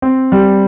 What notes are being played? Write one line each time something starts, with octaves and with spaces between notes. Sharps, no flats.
C4
G3